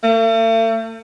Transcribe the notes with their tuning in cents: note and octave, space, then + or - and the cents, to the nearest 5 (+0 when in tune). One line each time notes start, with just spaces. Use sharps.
A3 +45